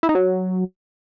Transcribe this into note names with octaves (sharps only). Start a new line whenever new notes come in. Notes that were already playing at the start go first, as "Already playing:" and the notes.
E4
D#4
F#3